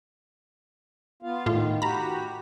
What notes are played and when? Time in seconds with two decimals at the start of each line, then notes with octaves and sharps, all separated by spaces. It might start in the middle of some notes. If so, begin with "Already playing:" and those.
1.22 B3 F4 F5
1.46 A2 D#3 F4
1.82 F#4 G4 A#5 B5